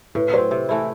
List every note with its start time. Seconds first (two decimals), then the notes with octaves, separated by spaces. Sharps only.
0.15 A2 B4
0.33 F#3 C4 C5
0.51 C3
0.69 E3 A3 E4